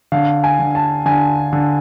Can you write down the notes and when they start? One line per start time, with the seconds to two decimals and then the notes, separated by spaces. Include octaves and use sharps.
0.12 D3 F5
0.44 G#5
0.59 D3
0.75 A5
1.06 D3 G#5
1.53 D3